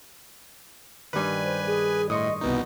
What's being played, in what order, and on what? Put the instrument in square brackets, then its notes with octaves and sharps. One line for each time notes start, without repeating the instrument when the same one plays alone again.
[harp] G2 D#3 [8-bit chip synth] B4 G#5
[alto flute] C5
G#4
[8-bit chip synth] A2 [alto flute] D#5 [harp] C6 C#6 D#6
[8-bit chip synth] C2 B2 D#4 [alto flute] B3